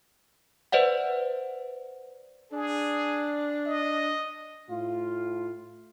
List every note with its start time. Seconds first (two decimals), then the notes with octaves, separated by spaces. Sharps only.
0.72 B4 C5 D5 E5 F#5
2.53 D4 G#4
3.66 D#5
4.69 A2 F4